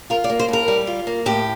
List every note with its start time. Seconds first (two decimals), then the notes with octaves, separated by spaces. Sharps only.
0.10 F4 A#4
0.24 D5
0.30 A#3
0.39 C5
0.48 A2 A#4
0.68 G3
0.87 F4
1.07 A#3
1.26 A2 G4